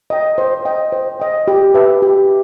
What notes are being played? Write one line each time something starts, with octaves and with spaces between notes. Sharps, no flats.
D#5 G5
C5
D#5 G5
C5
D#5 G5
G4
B4 E5 A5
G4